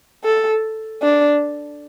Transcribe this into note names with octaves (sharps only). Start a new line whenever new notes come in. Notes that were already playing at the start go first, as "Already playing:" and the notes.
A4
D4